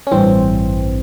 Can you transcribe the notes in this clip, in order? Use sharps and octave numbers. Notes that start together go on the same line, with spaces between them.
C#4
A1 G2 E3 C4